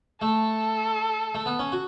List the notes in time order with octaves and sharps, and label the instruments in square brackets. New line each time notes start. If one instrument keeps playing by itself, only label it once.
[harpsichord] A3 [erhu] A4
[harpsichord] A3
B3
C#4
F#4